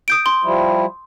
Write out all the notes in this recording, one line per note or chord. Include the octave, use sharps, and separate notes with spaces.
D#6 G6 D7
C6
F3 G3 E4